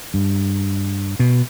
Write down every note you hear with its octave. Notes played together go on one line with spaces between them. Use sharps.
G2
B2